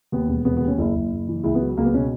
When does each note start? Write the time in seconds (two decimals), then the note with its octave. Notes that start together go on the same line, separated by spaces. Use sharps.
0.12 D#2 B3
0.29 E1
0.45 E1 B3
0.57 B3
0.62 D#2
0.68 C#4
0.78 F#1 E4
0.95 F#1
1.11 F#1
1.28 E3
1.44 C#2 E4
1.55 B3
1.60 F#3
1.77 C#2 A#3
1.85 B3
1.93 B2 C#4